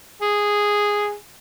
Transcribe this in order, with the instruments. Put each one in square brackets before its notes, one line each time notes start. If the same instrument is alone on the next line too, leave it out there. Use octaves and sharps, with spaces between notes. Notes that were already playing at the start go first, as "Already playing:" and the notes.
[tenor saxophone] G#4